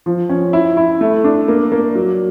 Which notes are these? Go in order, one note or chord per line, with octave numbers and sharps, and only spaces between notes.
F3
C#4
E4
E4
A3
D4
A#3
A#3
F#3